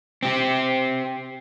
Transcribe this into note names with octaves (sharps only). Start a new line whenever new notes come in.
C4 G4